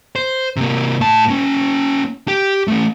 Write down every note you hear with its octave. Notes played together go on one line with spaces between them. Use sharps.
C5
C3 A#3
A2 A5
A#3 C#4
G4
A3 C#4